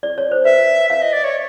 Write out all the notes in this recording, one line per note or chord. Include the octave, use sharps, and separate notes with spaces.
D5
C#5
C5
B4 E5
E5 F5
D#5
D5
C#5